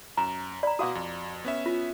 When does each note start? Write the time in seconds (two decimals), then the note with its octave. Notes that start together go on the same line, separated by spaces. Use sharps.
0.17 F#2 A#5
0.63 D5 A#5 B5
0.79 B2 F#4 F5 F#5 D6 D#6
0.95 F2
1.45 B3 C#4 E5
1.66 F4